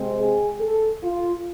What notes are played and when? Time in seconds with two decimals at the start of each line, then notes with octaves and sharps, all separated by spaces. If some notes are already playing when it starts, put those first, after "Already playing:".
Already playing: C3 G#3 C4
0.19 G#4
0.60 A4
1.03 F4